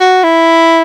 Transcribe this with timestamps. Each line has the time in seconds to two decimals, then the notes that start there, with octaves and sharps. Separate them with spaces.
0.01 F#4
0.24 E4